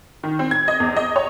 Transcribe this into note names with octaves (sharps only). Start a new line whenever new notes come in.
D#3
C4
G#6
D#5
E2
D#5
C#5